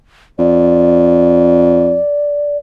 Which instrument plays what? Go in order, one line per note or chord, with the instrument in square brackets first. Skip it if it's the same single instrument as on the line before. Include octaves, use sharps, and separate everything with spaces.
[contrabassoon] F2 [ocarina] D5